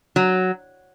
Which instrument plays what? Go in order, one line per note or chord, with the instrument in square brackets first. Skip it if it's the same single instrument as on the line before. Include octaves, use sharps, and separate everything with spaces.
[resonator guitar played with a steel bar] F#3